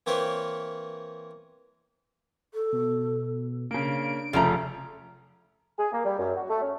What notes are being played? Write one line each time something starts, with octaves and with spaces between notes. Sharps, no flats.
E3 A#3 C4 A#4 B4 C#5
A4
B2
C#3 A#3 D4 D7
F1 C#3 F3 A3 A#5
G#4
A#3
G3
F#2
F#4
A3
C#4